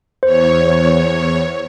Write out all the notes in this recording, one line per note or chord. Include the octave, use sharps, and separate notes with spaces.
E2 C5 C#5